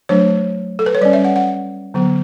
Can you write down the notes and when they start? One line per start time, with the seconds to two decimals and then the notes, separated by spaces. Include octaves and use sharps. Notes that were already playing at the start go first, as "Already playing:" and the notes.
0.09 F#3 A3 D4 C#5
0.79 A4
0.86 B4
0.95 C#5
1.01 G3 C#4 D5
1.13 E5
1.24 F#5
1.36 F#5
1.94 D3 F#3 B3